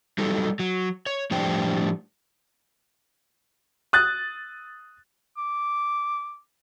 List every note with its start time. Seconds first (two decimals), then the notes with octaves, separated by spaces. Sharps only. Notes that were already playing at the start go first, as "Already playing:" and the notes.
0.18 F#3 G3 D#4 A4
0.59 F#3
1.06 C#5
1.31 A2 F3 G3 D4 C5 G5
3.93 D#6 F#6 A6
5.37 D6